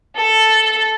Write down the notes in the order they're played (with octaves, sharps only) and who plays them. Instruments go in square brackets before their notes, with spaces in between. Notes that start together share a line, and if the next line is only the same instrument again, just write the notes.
[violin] A4